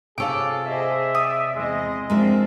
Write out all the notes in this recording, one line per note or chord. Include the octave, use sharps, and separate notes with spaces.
C3 F4 G#4 A4 C#5 D6
G#4 C5 D#5 E5
D5 D#6
E2 G#3 C4 D#5
F3 G#3 C4 D4 F4 A#4 E5